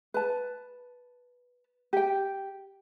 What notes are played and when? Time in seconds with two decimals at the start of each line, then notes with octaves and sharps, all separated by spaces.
0.14 B4 A5
1.93 G4 G5